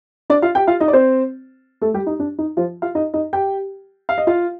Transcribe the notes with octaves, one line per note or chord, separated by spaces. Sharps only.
D4 D5
F4 F5
G4 G5
F4 F5
D#4 D#5
D5
C4 C5
A3 A4
G3 G4
D#4
D4
D#4
F3 F4
F4 F5
D#4 D#5
D#4 D#5
G4 G5
F5
D#5
F4 F5